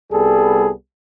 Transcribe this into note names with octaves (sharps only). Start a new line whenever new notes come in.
C2 G3 B3 G#4 A4